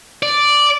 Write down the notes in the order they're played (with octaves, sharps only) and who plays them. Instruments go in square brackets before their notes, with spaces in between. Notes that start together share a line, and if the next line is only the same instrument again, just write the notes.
[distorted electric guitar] D5